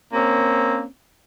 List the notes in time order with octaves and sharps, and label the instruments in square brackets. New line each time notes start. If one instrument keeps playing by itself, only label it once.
[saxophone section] A#3 C4 C#4